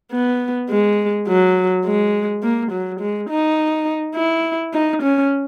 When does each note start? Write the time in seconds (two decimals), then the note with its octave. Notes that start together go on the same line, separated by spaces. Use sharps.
0.12 B3
0.69 G#3
1.27 F#3
1.85 G#3
2.43 A#3
2.72 F#3
3.00 G#3
3.29 D#4
4.15 E4
4.73 D#4
5.02 C#4